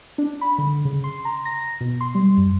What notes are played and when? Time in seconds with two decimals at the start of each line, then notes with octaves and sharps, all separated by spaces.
0.18 D4
0.41 B5
0.58 D3
0.85 C#3
1.04 C6
1.25 A#5
1.45 A#6
1.81 B2
2.01 C6
2.15 G3
2.37 F#2